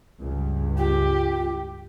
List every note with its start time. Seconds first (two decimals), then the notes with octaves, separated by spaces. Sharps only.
0.21 C#2 G2
0.77 F4 G4